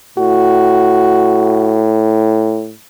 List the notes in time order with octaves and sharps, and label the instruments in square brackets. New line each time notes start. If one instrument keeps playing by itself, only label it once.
[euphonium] A2 [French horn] F#4